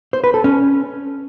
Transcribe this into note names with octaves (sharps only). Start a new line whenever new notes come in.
C5
B4
A4
C#4